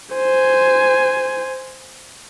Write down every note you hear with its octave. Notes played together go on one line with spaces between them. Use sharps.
C5 G#5